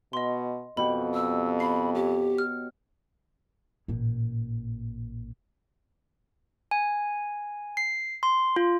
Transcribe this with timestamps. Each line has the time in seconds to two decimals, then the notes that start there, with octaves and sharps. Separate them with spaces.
0.13 B2 D#5 C6
0.77 F2 B2 G4 B5 C#6
1.14 E6
1.60 B5 C7
1.95 G4 C#5
2.38 F6
3.88 A1 A#2
6.71 G#5
7.77 C7
8.23 C6
8.56 F4